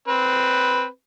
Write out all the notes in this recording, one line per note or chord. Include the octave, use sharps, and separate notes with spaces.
C4 B4